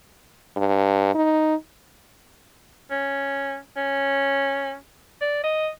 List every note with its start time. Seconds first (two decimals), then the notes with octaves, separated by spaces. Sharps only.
0.57 G2
1.15 D#4
2.91 C#4
3.76 C#4
5.21 D5
5.44 D#5